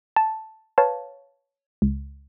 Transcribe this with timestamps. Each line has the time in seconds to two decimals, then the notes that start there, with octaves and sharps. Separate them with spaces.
0.16 A5
0.78 B4 C#5 F5 A5
1.82 C#2